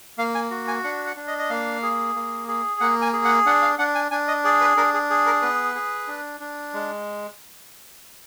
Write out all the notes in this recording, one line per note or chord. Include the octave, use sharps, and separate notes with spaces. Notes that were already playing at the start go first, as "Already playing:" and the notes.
A#3 F5
G#5
F#4
G#5
D4 F#5
F#5
D4
D#5
D#5
A#3 F5
G#4
A#3
G#4
A#3 F#5
G#5
G#4
F#5
D4 F#5
F5
D4 F#5
G#5
D4 G#5
D#5
G#4 D5
B4
D4 A#4
G#4
G#4
A#4
B3 B4
G#4
D4
D4
G#3